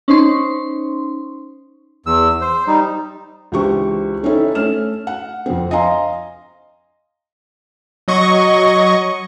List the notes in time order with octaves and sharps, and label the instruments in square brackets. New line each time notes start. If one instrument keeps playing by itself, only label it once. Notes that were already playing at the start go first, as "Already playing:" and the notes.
[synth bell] C#4 D#4 C5 C6 C#6
[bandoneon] E2 E6
C5
G3 D#4
[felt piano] C#2 E3 D4 G4 C5 C#6
C4 C#4 D#4 E4 A4
A3 C#4 F6 E7
F#5
F2 C4
D#5 F5 G#5 A#5 C6
[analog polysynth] F#3 D#5 C#6